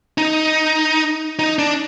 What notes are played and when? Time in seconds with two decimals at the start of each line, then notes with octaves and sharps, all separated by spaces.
0.18 D#4
1.39 D#4
1.59 D4